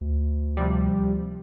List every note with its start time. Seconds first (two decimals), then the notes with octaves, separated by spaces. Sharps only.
0.01 D2
0.57 C3 F3 G3